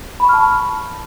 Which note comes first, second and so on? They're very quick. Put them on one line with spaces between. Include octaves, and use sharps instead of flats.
B5 C#6 F6 A5